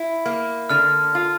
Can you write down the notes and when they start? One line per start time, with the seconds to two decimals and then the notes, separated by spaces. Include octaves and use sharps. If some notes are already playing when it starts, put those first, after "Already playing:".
Already playing: E4
0.26 A#3
0.69 D3 F6
1.15 F4